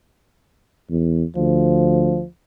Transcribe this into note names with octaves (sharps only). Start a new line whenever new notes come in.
E2
D2 F3